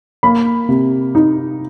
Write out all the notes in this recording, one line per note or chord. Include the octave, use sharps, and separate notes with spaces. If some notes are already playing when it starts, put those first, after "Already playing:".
A#3 B5
C3
D#4